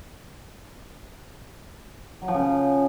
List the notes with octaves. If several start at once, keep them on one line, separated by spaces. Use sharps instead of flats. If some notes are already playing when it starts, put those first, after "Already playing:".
F#3
F3
C#3